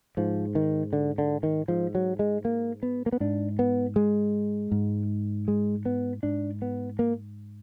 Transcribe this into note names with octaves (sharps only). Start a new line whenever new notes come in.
G#2 F3
D#3
D3
D3
D#3
G#2 F3
F#3
G#3
A#3
B3
A#3
B3
G#2 D4
B3
G#3
G#2
G#3
B3
G#2 D4
B3
A#3